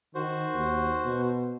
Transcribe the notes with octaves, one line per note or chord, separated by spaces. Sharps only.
D#3 F#4 C5
D#2
B2